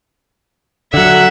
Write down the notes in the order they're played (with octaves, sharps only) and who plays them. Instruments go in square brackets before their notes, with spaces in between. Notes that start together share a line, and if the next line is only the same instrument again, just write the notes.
[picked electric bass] D3 F#3 [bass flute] A4 [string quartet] E5 F#5